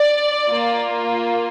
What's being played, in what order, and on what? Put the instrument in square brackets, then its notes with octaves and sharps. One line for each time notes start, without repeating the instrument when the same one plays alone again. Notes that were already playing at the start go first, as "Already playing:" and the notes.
Already playing: [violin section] D5
A#3 F4